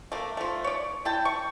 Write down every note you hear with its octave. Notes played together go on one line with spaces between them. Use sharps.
A3 A#3
F3 A3
C#5 D5
E4 G5 A5
C#6